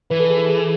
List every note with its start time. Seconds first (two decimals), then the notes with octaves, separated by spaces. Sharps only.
0.10 E3 B4
0.20 A4
0.30 G#4
0.39 A4
0.49 G#4